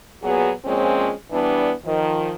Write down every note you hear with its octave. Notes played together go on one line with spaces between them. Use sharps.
A#2 F#3 B3 F#4 G#4
A#2 F3 G#3 C4 C#4
E3 G3 B3 D4
D#3 F3